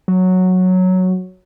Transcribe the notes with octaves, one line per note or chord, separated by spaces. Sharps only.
F#3